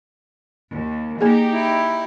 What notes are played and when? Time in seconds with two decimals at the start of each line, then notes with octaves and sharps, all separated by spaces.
0.73 D#2
1.21 A#3 D#4 G4 G#4
1.53 E4